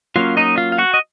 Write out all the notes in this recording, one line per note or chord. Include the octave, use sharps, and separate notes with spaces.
F#3 A#3 C#4 F4 F5
D#4 D#5
F4 F5
F5
F#4 F#5
D#5